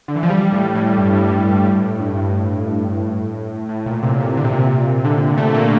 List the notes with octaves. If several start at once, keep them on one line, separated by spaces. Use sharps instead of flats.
D3
E3
F3
G3
A2
A2
G2
A2
A2
G2
A2
G2
A2
A2
A#2
C3
A#2
D3
C3
A#2
C3
D3
A3
A#3